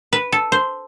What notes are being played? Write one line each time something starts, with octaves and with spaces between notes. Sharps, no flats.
B4
A4
C5